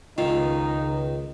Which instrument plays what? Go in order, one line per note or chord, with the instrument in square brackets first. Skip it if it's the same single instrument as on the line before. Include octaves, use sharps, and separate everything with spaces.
[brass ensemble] C#2 [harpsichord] D#3 [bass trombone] D#4 [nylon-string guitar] F4